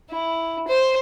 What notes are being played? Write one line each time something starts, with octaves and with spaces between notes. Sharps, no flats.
E4
C5